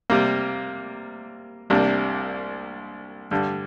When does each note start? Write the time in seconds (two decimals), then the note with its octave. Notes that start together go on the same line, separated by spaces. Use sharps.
0.10 C3 G3 A#3
1.70 C2 C3 G3 A#3 D4
3.31 G2 D3 G3